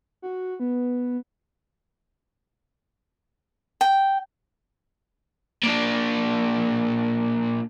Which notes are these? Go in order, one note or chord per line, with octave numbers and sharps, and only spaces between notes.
F#4
B3
G5
A#2 D4